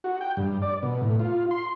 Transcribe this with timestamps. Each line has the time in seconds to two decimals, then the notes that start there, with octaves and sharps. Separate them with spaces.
0.04 F#4
0.21 G5
0.37 G2
0.62 D5
0.83 B2
1.02 A2
1.19 F4
1.51 C6